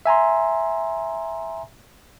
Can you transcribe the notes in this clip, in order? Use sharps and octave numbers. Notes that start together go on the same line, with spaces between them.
E5 G#5 A#5 C6